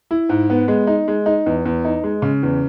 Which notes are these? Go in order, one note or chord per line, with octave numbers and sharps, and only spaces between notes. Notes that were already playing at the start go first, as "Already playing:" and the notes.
E4
G#2
B3
G#3
D#4
G#3
D#4
E2
E2
D#4
G#3
C#3
E2